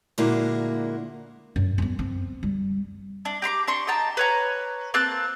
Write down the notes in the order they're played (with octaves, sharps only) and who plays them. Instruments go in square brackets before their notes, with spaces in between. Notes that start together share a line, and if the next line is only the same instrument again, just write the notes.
[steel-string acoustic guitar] A#2 D3 G#3 A#3 E4 F#4
[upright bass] F#2
F#2 B3
C4
G3
[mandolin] D4
G4 A#5 C6 D6
D4 C6 C#6
D#5 G5 A5 A#5
B4 C#5 A#5
A#3 C4 A5 F#6